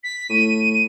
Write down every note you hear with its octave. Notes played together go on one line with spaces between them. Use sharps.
B6
A2 D#7